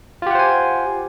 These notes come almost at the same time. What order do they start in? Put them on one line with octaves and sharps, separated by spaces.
F4 G4 F#5 C5 G#5